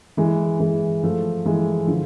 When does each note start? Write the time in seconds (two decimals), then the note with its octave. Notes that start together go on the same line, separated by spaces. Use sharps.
0.17 E3 G#3
0.60 E3 G#3
1.03 F3 A3
1.45 E3 G#3
1.87 D3 F3